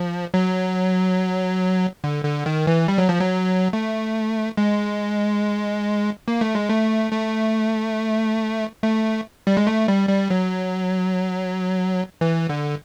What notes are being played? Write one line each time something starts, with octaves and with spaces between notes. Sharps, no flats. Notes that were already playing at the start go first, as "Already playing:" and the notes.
Already playing: F3
F#3
D3
D3
D#3
E3
G3
F#3
F3
F#3
A3
G#3
A#3
A3
G#3
A3
A3
A3
G3
G#3
A3
G3
G3
F#3
E3
D3